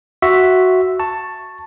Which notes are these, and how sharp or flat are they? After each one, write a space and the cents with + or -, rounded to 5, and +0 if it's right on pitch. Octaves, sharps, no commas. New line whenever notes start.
F#4 +0 E5 +0 C6 +0
A5 +10 C#6 -5